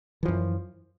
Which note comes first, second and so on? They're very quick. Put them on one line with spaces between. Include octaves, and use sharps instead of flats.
E3 F3 F#2